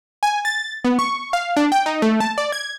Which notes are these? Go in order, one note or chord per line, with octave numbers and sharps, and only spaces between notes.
G#5
A6
B3
C#6
F5
D4
G5
D#4
A3
A5
D5
G#6